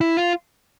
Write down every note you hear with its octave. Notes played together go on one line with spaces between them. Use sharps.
E4
F4